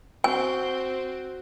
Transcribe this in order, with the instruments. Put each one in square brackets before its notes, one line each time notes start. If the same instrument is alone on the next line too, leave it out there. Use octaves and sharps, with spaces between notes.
[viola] C4 [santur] F#4 [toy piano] G#5